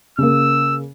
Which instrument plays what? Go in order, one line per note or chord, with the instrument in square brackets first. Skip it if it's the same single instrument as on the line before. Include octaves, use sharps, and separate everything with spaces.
[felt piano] C#3 A#3 [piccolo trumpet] E6